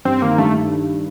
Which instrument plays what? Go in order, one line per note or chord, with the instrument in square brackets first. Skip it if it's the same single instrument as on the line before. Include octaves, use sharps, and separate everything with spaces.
[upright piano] G2 [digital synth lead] C4
[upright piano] D#3 [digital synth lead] A#3
[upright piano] G2 [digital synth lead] A3